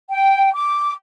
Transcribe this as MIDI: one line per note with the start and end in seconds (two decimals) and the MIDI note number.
0.08 0.52 79
0.53 0.92 86